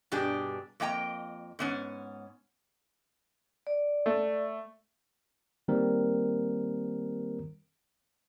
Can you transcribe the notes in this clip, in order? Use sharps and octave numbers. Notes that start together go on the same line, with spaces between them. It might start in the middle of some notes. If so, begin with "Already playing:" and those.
G2 B2 D4 G4 G#4
F2 A#3 D#5 G5 A#5
G#2 B3 C#4
D5
A3
D#3 G3 A#3 C4 A#4